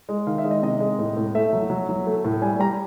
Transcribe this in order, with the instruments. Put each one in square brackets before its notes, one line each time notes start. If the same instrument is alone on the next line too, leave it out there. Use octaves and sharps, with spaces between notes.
[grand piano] G#3
D#3 F5
E5
G#3
D#5
C3 D#5
G#3
A2
A2
A3 E5
F#3
F#3
F#3
A3
A2
G3 G#5
G3 A#5